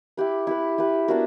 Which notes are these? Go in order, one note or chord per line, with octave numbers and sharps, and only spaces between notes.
E4 G4 B4
E4 G4 B4
E4 G4 B4
B3 D4 F#4 A#4